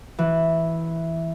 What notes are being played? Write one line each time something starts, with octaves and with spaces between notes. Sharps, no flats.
E3